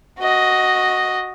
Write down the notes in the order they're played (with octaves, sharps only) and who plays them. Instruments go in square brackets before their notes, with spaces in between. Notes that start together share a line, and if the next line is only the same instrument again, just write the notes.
[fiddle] F#4 D#5